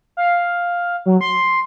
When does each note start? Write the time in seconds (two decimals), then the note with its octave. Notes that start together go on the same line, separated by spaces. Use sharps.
0.17 F5
1.06 F#3
1.21 C6